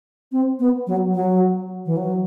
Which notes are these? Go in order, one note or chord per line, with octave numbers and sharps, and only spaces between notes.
C4
B3
F#3
F#3
E3
F#3